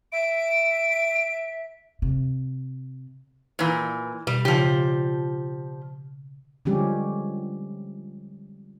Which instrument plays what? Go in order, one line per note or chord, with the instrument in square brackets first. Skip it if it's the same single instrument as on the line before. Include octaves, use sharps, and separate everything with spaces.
[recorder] E5 [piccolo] D7
[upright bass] C3
[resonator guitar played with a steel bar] A#2 E3
[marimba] B2 [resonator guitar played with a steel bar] G3
[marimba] C#3 [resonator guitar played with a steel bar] F3 G4
[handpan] D3 F3 G3 G#3 C#4 G4